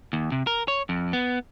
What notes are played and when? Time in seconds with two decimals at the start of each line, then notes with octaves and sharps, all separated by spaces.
0.13 D#2
0.32 C3
0.47 A#4
0.68 C#5
0.89 F2
1.13 B3